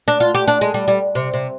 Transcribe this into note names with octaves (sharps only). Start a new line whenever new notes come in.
D4
F4
G4
D4
G#3
G3
G3
C3
C3